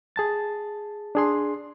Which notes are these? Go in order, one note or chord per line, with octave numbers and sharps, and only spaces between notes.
G#4 A5 A6
D4 G#4 C6